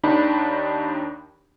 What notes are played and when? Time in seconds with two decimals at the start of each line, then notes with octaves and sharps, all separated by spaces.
0.03 D#2 D#3 D4 D#4 B5